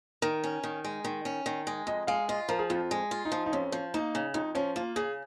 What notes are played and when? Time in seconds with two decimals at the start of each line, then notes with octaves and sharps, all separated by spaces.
0.22 D#3 A#4
0.44 C#4
0.64 D#3
0.85 G#3
1.05 D#3
1.25 C#4
1.46 D#3
1.67 G#3
1.87 F2 D#5
2.07 G#3 F5
2.29 F4 D#5
2.49 F3 A#4
2.59 G#4
2.70 F2 F4
2.91 G#3
3.11 F4
3.25 D#4
3.32 F3
3.46 D#4
3.52 F2 C#4
3.72 F3
3.94 A#3 D#4
4.15 C#3
4.34 F2 D#4
4.55 F3 C#4
4.76 A#3 F4
4.96 C#3 G#4